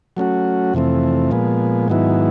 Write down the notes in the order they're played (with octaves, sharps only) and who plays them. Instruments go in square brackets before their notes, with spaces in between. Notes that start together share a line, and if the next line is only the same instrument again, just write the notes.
[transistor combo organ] F#3 A3 C#4 F#4
F2 C3 E3 A3 C4
A#2 F3 G#3 B3
G#2 D#3 F#3 B3 E4